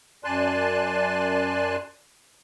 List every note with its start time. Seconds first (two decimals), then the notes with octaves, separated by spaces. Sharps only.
0.24 F#2 D5 G#5 A5 C6 F#6